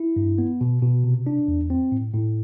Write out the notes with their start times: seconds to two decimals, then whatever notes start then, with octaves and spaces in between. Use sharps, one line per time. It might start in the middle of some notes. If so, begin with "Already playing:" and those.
Already playing: E4
0.16 G2
0.38 B3
0.61 B2
0.82 B2
1.04 C3
1.27 D4
1.48 E2
1.70 C4
1.92 A2
2.14 A2